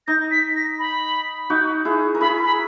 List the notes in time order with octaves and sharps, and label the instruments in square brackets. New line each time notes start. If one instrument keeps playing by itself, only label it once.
[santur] D#4 [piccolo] A#6
[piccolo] B6
A#6
B5
[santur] D#4 F#4
E4 G#4
A#4
[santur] E4 G#4 [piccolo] B5
[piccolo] B5